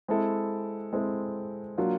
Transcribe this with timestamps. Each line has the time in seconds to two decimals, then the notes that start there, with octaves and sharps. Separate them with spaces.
0.08 G#3 C4 E4 A4
0.93 G#3 C4 E4 A4
1.78 F#3 A#3 D4 F4